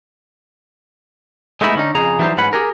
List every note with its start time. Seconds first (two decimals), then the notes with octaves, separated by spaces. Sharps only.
1.61 G#3 A3 B3 D#4 E4
1.76 D3 C#4 D#4
1.95 F2 C#3 G#4 A#5
2.19 E3 F#3 G3 A3 D#4 C5
2.38 G#2 C#4 B4 F#5 B5
2.53 G4 G#4 A#4